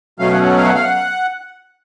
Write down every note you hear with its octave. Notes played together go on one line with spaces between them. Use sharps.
B2 F#3 A3 C#4 F5
F#5
F#5
F5
F#5
F5
F#5